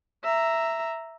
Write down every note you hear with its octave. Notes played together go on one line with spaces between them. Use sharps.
E5 A#5